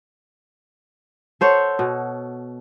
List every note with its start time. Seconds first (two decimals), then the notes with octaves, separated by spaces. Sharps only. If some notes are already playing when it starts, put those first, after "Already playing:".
1.41 A4 C5 C#5 F#5
1.79 B2